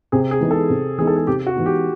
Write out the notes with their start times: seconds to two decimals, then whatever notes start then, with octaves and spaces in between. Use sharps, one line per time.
0.12 C3 G#4
0.31 G#4
0.41 E3 G#3 B3 D#4
0.51 A4
0.70 C3
0.98 E3 G#3 B3 D#4 G#4
1.07 A4
1.16 G#4
1.27 C3 G4
1.47 F#4
1.56 E3 G#3 B3 D#4
1.66 G4